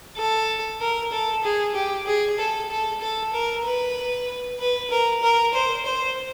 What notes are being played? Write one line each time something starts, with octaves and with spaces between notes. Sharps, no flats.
A4
A#4
A4
G#4
G4
G#4
A4
A4
A4
A#4
B4
B4
A#4
A#4
C5
C5